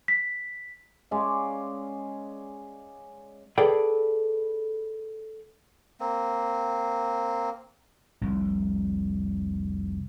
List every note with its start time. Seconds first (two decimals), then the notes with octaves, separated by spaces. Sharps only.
0.08 B6
1.11 G#3 C#4 D5 F5
3.58 G#4 A4 B4 D5 G5
6.00 A#3 C4
8.21 F1 C2